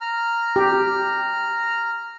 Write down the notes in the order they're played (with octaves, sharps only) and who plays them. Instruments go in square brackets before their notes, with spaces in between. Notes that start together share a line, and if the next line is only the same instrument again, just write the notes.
[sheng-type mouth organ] A#5 F6
[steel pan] G4